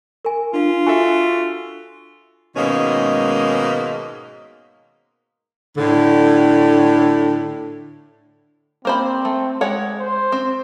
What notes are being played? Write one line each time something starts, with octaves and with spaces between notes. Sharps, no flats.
A#4 G#5
D4 F4 F5
F#4 A4 E5 G#5
G#2 B2 D#3 G#3 A#3 C#4
A2 D3
A#3 C4 C5 B5
A3
G#3 C#5 F#5
C5
C4